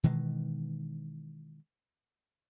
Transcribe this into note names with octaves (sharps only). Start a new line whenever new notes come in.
B2 D#3 E3 G#3